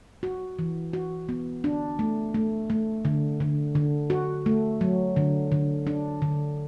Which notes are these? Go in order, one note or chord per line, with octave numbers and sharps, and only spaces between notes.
F#4
E3
F#4
B3
D4
A3
A3
A3
D3
D3
D3
F#4
A3
F#3
D3
D3
D4
D3